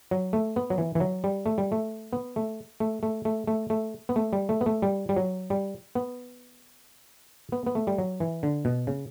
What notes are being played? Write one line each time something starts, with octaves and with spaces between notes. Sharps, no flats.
F#3
A3
B3
F#3
E3
E3
F#3
G3
A3
G3
A3
B3
A3
A3
A3
A3
A3
A3
B3
A3
G3
A3
B3
A3
G3
G3
F#3
G3
B3
B3
B3
A3
G3
F#3
E3
D3
B2
C#3